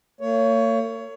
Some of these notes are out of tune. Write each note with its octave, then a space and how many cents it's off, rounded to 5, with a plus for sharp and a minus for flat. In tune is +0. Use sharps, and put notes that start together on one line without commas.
A#3 -45 C#5 +15